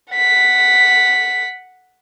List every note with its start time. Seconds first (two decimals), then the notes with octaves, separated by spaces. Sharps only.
0.14 F#5 B6